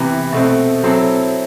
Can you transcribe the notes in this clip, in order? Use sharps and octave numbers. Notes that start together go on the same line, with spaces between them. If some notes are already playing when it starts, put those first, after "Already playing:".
Already playing: C3 E3 B3
B2 A3 C4
F#3 C4 E4 A4